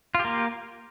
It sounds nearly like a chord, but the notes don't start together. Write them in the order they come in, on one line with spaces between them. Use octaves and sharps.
F4 G4 A#3